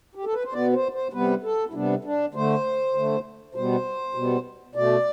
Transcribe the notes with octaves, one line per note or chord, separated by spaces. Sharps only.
G4
A4
B4
C5
B2 B3 D5
C5
C5
C3 G3 B3 B4
A4
E4
C3 G3 B3 D4
D4
D3 A3 C5
D3 A3
B2 G3 B3 C5
B2 G3 B3
B2 A3 D5